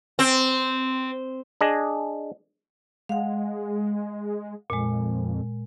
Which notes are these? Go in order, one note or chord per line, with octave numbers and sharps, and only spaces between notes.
C4
D4 G#4 D#5
G#3 F5 F#5
F2 A#2 G#3